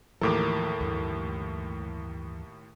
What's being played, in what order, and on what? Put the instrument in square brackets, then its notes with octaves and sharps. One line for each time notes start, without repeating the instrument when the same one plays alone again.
[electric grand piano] D#2 A2 A4 [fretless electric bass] E3 F3 [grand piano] A#4 D6
[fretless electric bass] D2 G2 E3